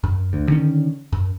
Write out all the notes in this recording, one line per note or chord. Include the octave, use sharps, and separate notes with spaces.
F#2
D2
D3 D#3 C#4
F#2